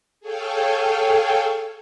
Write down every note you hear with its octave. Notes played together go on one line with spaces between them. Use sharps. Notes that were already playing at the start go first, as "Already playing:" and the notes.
G#4 A4 C#5 F5 G5